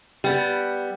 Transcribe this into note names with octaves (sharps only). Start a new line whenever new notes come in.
G3 B3